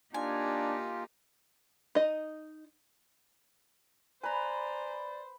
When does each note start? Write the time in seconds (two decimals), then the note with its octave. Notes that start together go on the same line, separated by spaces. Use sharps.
0.14 A#3 D4 D#4 F4 G4 G#5
1.95 D#4 D#5
4.23 B4 C5 D5 G#5 A#5 B5